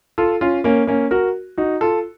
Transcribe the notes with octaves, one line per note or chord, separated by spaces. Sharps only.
F4 A4
C#4 F4
A#3 C#4
A#3 C#4
F#4 A#4
D#4 F#4
F4 A4